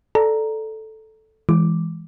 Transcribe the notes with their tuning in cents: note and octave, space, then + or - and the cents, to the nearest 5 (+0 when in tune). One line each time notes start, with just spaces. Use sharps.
A4 -5 D5 +0 A#5 +0
E3 +0 G#3 +0 D6 +0